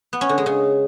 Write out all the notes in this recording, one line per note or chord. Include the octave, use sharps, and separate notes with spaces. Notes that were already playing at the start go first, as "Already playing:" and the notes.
B3
C#4
D3
G#3
C#3